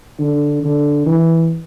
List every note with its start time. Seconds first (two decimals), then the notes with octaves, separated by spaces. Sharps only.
0.19 D3
0.64 D3
1.06 E3